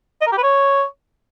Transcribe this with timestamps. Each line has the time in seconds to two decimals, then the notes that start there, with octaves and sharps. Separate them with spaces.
0.21 D#5
0.27 A#4
0.32 G4
0.38 B4
0.43 C#5